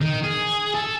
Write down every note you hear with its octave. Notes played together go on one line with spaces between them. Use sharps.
D#3
G#4
A4